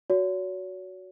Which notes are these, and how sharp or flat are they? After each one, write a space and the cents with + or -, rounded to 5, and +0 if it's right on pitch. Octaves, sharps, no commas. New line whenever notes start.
F#4 +0 C#5 +40